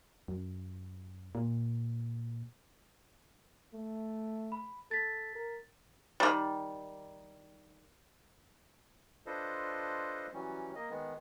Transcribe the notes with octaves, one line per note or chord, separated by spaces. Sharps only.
F#2
A#2
A3
B5
A4 A6 B6
A#4
D#3 G3
D4 F4 A4 B4 C5 D#5
E3 F#3 G3 C#4
A#3 D#5
D#3 G#3 B3